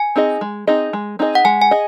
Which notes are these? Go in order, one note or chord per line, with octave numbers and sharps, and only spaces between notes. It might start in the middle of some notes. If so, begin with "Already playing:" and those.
Already playing: G#5
C4 D#4 G#4 D#5
G#3
C4 D#4 G#4 D#5
G#3
C4 D#4 G#4 D#5
F#5
G#3 G#5
G#5
G#4 D#5